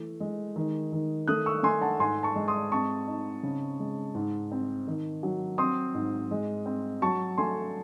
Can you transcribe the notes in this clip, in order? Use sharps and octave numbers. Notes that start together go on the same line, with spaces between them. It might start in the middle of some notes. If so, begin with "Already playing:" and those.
Already playing: E3 A3
G#3
D#3
D#3
A3 D#6 F#6
C#6 E6
A3 G#5 C6
F#5 A5
G#2 G#5 C6
A5 C#6
G#3
C6 D#6
C4 A5 C#6
D#4
C#3
G#3
G#2
C4
D#3
F#3
C4 C6 D#6
G#2
G#3
C4
F#3 A5 C#6
A3 G#5 C6